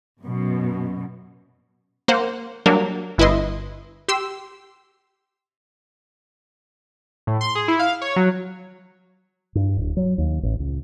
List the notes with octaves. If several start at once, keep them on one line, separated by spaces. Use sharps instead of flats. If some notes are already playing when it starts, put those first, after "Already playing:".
F#2 B2
A#3 C5 F#5
F#3 G3 A#3 D4 A#4
G1 E4 B4 D#5 C6
G4 C6 E6
A2
C6
G#4
E4
F5
C#5
F#3
G2
D1
F#3
D#2
A1
C#2